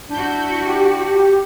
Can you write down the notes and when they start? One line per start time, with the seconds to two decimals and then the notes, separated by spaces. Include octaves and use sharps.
0.11 D4 E4 F#4 G6
0.65 G4